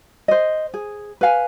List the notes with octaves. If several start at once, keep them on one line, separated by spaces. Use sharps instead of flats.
C5 D#5
G#4
B4 F5 G#5